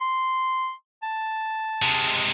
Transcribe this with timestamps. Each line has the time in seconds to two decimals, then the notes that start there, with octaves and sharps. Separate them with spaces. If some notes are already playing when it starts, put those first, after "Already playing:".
0.01 C6
1.03 A5
1.82 C3 G#3